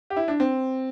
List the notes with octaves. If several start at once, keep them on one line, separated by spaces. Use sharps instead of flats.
G4
E4
D4
C4